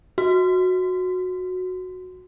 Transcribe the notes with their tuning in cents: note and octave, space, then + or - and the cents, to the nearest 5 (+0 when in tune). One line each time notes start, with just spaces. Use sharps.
F#4 -10